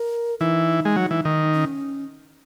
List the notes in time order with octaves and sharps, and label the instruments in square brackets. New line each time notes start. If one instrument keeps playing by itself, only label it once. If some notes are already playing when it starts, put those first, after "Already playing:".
Already playing: [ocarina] A#4
[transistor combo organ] E3 [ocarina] D#4
[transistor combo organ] G#3
F#3
E3
D#3
[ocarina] C#4